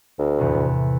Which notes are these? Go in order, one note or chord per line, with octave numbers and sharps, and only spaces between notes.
D2
E2 A2 C3